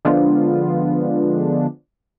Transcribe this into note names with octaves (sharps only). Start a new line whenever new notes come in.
D3 F3 G#3 B3 D4 F4